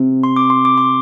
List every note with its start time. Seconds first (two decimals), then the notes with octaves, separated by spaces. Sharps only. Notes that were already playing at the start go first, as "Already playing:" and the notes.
Already playing: C3 C4
0.23 C6
0.36 D6
0.50 C6
0.65 D6
0.78 C6